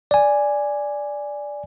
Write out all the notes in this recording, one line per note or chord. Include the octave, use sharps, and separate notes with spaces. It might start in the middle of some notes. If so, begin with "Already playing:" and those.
D5 G#5